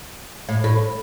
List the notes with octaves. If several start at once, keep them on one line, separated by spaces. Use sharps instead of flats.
A2
A2